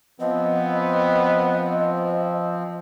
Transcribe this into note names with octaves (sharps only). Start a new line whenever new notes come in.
F3 B3 C4 D#5